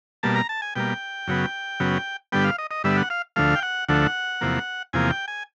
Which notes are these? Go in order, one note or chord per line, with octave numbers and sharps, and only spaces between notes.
B2 G3 A#3 A5
A#5
A5
G#5
B2 G3 A#3 G5
F#2 C#3 F#3 B3
F#2 C#3 F#3 B3
G2 D3 G3 B3 G5
F5
D#5
D#5
G2 D3 G3 B3 E5
F#5
F5
D2 D3 F3 A3 F5
G5
F#5
D2 D3 F3 A3 F#5
E2 C3 F3 A#3
E2 C3 F3 A#3 G#5
G5
G#5